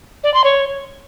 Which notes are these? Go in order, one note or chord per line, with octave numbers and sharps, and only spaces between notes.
D5
C6
C#5